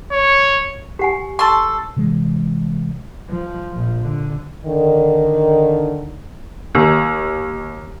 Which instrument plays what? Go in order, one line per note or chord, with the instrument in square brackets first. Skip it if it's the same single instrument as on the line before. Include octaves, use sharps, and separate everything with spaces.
[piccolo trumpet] C#5
[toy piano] G4 F#5 G#5
[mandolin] A4 C6 [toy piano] A5 C#6
[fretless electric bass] C3 E3 G#3
[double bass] F3
A#1 F3
D3
[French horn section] D3 D#3
[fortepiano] D#2